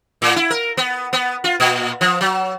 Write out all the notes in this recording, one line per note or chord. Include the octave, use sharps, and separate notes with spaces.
A2
E4
A#4
B3
B3
F4
A#2
F3
F#3